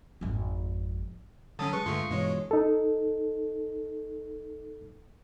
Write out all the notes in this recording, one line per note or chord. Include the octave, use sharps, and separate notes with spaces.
G#1 F2
D3 F#3 C#4 A5 D#6
G#3 B4 C#6
G2 D3 A3 F4 C6
G2 B2 E3 G#3 C#5
D#4 A4